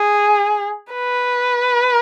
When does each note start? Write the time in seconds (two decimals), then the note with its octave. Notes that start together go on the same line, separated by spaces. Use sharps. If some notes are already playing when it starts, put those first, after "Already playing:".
Already playing: G#4
0.93 B4